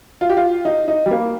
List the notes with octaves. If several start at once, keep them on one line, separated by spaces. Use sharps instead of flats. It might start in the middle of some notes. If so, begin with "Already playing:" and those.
F4
G4
F4
D#4
D#4
G3
A#3